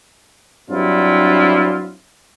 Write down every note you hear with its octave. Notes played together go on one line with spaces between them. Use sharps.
G2 F#3 C4 D4 E4 F4